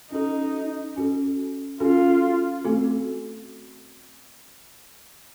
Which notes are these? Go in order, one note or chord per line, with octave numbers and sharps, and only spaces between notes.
C#4 D#4 F#4 A4
C#4 F#4 A4
C#4 F4 F#4 A4
A3 C4 F#4 A4